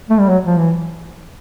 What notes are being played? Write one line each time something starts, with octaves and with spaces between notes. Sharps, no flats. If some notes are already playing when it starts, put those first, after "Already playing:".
A3
G3
F#3
F3
E3